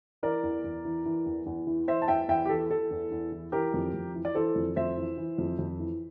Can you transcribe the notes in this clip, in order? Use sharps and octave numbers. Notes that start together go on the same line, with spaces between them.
E3 A#4 D5
E2
E2
E3
E3
E2
E2
E3
E3 C5 E5
A5
E2 E5 G5
E2 E5 G5
G4
E3 A4
E3 A4
E2
E2
E3
E3 G4 A#4
F2
F2
E3
D5
E3 A4 C5
F2
F2 C5 E5
E3
E3
F2
F2
E3